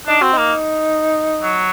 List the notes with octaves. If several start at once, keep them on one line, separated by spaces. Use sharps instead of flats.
D4 D#4
C4 F#4
A#3 D#4
F#3